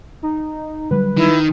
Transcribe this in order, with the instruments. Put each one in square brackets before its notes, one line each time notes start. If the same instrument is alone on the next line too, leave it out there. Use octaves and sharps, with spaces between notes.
[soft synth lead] D#4
[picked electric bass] D3 F#3 G3 [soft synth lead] B4
[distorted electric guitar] D#3 [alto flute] E4